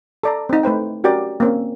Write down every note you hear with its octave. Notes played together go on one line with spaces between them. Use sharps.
A4 D5 A#5
C4 D#4
A3 B4 C5 G5
C#4 F#4 G4 A#4 D5
A#3 C4 C#4